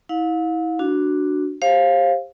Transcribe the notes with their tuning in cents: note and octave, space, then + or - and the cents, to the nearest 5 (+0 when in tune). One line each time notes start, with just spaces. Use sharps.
E4 -35 F5 +40
D4 +0 F#4 +0
G4 +25 C5 +35 F5 +0